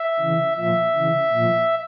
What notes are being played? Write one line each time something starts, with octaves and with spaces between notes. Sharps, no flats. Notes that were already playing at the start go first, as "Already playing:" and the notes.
Already playing: E5
C#3 E3
A#2 F3 E5
C#3 E3
A#2 F3